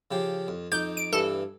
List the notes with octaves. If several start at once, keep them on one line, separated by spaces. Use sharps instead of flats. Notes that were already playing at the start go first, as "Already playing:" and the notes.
C#3 F3 G4
F2
F2 D#4 D6 G6
D7
G2 E3 A4